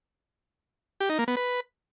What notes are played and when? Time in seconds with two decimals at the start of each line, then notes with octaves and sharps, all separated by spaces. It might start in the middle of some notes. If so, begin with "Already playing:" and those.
1.00 G4
1.10 D#4
1.19 A#3
1.28 B3
1.37 B4